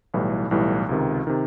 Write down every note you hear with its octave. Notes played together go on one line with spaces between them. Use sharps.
B1 A2 E3 G3
B1 A2 E3 G3
C#2 C3 D#3
C3 D#3